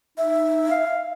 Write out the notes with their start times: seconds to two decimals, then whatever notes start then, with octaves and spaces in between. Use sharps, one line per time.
0.18 D#4 E5
0.71 F5